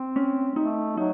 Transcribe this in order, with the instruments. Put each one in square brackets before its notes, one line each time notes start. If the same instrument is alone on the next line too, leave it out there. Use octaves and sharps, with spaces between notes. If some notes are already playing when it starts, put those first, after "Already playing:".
Already playing: [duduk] C4
[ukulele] C#4
[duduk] A3 [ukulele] D#4
[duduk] F#3 [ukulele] D#4